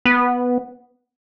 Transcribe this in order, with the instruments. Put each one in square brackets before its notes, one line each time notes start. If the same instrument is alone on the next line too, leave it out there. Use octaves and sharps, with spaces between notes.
[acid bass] B3